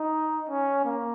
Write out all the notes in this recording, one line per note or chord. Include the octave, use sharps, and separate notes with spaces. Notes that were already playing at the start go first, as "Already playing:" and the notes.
Already playing: D#4
C#4
A#3